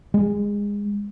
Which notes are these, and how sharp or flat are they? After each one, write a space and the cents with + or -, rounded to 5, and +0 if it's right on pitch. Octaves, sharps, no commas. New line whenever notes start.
G#3 -25